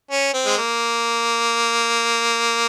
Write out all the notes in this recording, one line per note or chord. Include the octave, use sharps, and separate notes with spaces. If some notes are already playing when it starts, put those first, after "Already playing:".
C#4
C4
G#3
A#3